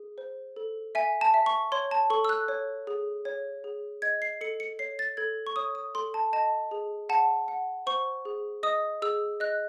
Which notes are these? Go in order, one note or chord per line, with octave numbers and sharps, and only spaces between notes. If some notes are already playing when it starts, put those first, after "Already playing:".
Already playing: G#4
C5
A4
E5 G#5
A5
E5
C#6
C#5 C6
A5
A4 C#6
E6
F#6
C#5
G#4
C#5
G#4
D#5 G#6
C7
A4 C#7
C#7
C#5 C7
A6
A4 G#6
C#6
C#5 D#6
D#6
A4 C6
A5
D#5 A5
G#4
F#5 A5
F#5
C5 C#6
G#4
D#5 D#6
G#4 E6
D#5 F#6